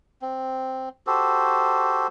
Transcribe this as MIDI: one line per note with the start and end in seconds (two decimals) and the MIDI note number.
0.22 0.89 60
1.07 2.07 66
1.07 2.07 67
1.07 2.07 69
1.07 2.07 72